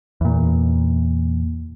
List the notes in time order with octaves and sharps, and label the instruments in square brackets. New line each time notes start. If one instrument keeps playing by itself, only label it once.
[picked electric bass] E2 A#2